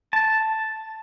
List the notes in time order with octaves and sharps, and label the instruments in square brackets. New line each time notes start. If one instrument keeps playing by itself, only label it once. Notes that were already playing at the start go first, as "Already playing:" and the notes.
[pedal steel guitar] A5